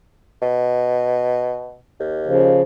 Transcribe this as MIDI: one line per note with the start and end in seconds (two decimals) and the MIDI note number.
0.42 1.78 47
2.00 2.59 39
2.26 2.62 49
2.26 2.62 53